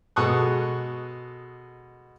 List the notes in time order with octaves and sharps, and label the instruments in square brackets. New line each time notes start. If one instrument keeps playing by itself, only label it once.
[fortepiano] B2 G#3 A4 C#6 D#6 F#6